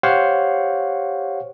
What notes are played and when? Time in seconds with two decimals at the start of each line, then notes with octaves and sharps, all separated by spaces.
0.03 G4 C5 C#5 F5 F#5